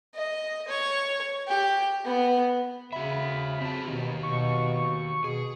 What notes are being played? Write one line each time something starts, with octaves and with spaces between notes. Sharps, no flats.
D#5
C#5
G4
B3
C#3 F#4 E5 B5
C4 F4 A5
B2 D#3 G4
B2 C#6
B2 G#4